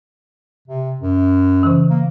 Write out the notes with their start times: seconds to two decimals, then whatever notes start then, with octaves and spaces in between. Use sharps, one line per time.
0.68 C3
1.01 F#2
1.63 C#3 E3
1.90 A#3